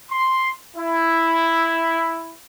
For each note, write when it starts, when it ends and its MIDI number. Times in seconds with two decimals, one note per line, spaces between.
0.11 0.51 84
0.76 2.34 64